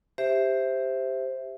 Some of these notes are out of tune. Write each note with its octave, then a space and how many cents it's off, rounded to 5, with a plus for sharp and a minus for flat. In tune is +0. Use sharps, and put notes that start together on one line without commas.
G4 +5 C5 +0 E5 +0